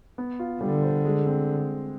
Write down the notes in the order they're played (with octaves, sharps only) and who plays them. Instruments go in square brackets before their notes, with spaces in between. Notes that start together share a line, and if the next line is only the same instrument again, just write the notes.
[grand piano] B3
F4
[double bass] D3 [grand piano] G3
[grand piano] C5
G#3
C4